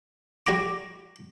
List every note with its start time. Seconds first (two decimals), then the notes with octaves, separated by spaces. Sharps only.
0.47 G3 F#4 A#5 D6